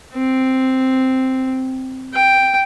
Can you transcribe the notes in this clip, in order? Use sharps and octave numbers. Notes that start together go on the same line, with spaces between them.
C4
G5